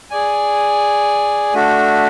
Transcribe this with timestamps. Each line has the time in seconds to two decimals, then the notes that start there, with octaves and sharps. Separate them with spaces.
0.10 G#4 D5 G#5
1.54 A3 D4 F#4